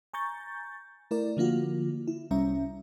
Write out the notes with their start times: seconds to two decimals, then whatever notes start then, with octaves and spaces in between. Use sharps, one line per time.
0.13 G#5 A#5 C#6 G6 A6
1.11 A3 E4 A#4 D5
1.37 D3 F3 A#3 F4 F#4
2.08 E4
2.31 C2 G3 C#4 E5 A#5